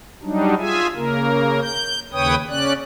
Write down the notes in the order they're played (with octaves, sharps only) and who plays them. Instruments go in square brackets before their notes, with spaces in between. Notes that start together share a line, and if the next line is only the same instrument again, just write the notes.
[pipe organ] F#3 G3 D4 D#4
F4 G#4 E5 G#5
C#3 A#3 A#4
G6
D#2 C#3 B4 C#5 G5 D#6
C#3 C#4 D5 F#6